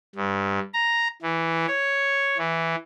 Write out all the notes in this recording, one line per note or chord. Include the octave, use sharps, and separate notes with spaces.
G2
A#5
E3
C#5
E3